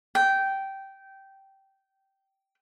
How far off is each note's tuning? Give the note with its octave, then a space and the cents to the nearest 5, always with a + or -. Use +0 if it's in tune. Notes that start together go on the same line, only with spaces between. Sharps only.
G5 -15